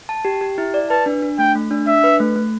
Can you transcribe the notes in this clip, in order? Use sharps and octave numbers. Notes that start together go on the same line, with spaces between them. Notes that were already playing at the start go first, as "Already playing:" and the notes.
A5
G4
G4
E4
D5
B4 A5
D4
D4
A3 G5
A3
D4
D4 E5
B4
A3
A3